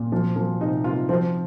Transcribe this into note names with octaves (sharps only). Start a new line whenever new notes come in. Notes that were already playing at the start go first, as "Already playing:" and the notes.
Already playing: A#2
F3
F3
C3 D#4
C3 F4
F3 C4